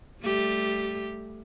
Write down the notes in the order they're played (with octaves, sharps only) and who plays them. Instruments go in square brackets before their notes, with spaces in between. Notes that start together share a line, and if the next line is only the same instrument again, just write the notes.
[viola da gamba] G3 A3 G4